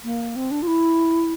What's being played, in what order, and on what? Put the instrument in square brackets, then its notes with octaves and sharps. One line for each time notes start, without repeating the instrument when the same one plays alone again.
[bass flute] A#3
C4
D4
F4
E4